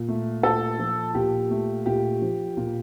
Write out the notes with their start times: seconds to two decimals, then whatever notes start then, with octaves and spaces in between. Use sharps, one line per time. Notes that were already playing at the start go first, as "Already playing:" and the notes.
Already playing: A#2
0.08 A3
0.43 A#2 A4
0.79 F3
1.15 A#2 G4
1.51 A3
1.86 A#2 G4
2.22 F3
2.57 A#2